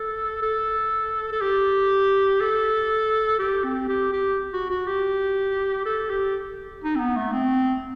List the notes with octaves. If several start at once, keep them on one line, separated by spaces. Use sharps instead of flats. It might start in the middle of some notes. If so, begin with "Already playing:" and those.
Already playing: A4
A4
A4
G4
A4
G4
C4
G4
G4
F#4
F#4
G4
A4
G4
D#4
C4
B3
A3
C4